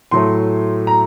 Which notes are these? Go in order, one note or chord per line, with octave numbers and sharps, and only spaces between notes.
A2 F#3 A3 C6
A#5